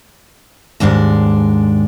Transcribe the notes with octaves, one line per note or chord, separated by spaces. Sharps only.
D#2 G#2 G#3 D4